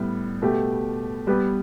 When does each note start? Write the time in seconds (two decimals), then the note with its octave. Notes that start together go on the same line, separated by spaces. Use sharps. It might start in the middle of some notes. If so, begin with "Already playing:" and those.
Already playing: A2 G3 B3
0.42 B2 A3 G4
1.27 G3 B3 G4 B4